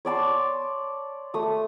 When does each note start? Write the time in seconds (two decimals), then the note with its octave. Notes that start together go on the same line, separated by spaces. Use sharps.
0.05 C#5 D5 A5 C6
1.34 A3 D#6